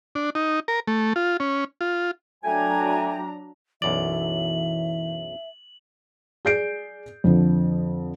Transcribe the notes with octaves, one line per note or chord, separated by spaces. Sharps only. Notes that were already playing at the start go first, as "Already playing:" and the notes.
D4
D#4
A#4
A3
F4
C#4
F4
F#3 A3 D4 G5 G#5 A#5
B1 F#2 E3 D5 E5 F#7
G#4 D5 G6 C7 D7
F2 D3 F3